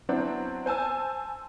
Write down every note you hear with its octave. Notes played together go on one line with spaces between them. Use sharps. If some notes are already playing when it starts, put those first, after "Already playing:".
F#3 B3 C4 D4 E4
C5 G#5 A5 E6